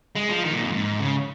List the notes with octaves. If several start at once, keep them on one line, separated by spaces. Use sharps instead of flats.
G#3
F3
D#3
A#2
F2
G#2
C#3